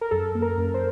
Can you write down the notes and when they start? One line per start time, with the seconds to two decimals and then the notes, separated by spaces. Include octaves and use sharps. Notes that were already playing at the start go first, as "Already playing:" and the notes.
0.01 A#4
0.11 F#2 A4
0.35 A#3
0.42 A#4
0.58 F#2
0.74 C5